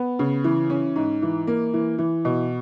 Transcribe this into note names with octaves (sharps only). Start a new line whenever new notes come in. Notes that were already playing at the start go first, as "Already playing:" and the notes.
Already playing: B3
C#3
E3
C#4
G#2
E3
A#3
E3
E3
B2